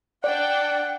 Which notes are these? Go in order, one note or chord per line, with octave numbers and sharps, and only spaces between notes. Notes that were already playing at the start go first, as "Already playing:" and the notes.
D4 D5 F#5 G5